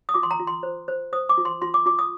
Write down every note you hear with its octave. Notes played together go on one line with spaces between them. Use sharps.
D#6
F4 D6
C6
A#5
F4
C6
C5
C5
C5 D#6
D6
F4
C6
F4 C6
D6
F4 D6
D#6